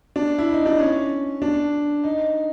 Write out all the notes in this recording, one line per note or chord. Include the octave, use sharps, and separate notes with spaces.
D4
E4
D#4
D4
C#4
D4
D#4